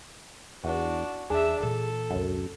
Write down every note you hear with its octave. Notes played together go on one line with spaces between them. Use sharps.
E2 D4 F#4
E2 D4 G#4 E5
A#2 E3 A4
E1 C#2 F#2